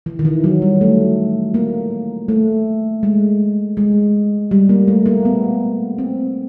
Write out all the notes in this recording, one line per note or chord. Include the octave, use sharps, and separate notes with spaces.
E3
D#3
E3
F#3
G3
A3
A#3
A3
G#3
G#3
G3
A#3
A3
A#3
B3
C4